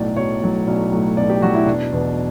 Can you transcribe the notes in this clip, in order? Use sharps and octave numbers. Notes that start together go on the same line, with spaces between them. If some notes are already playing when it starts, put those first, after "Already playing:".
Already playing: B1 A2 F#3 D5
B1 C#5
A2 F#3
B1 D5
A2 F#3
B1 D5
G4
A2 F#3 F#4
E4
E1 D4
E2 B2